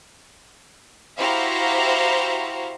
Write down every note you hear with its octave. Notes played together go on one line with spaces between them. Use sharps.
E4 F#4 G4 C5 F5 A#5